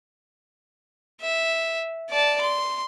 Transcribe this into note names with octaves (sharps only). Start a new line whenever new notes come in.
E5
D5 A5
C6